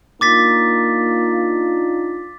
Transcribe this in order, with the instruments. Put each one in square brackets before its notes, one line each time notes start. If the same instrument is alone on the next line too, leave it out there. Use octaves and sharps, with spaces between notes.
[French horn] A#3 [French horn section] D4 D#4 F4 [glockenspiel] D6 A6 B6